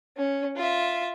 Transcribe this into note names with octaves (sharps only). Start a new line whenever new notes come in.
C#4
F4 E5